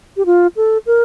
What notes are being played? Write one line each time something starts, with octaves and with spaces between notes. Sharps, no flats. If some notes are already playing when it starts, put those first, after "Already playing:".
G4
F4
A4
A#4